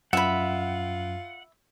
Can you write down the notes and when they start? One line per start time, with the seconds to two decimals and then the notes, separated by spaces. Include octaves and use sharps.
0.13 F#2 F4 E5 F#5 B5